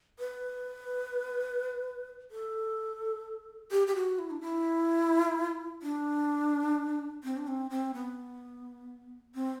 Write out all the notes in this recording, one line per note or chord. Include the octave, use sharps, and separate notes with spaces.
B4
A4
G4
G4
F#4
E4
D4
E4
D4
C4
D4
C4
C4
B3
C4